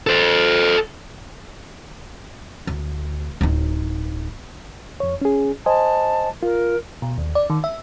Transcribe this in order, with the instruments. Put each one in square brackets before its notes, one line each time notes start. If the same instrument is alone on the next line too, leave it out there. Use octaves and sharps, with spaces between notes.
[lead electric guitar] A4 C5
[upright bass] D2
D1 D#4
[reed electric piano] F2 C#5
C#4 G#4
[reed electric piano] C5 D#5 G#5 [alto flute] A5
[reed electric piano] F4 [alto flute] A#4
[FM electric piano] B2
D#2
D5
D#3
E5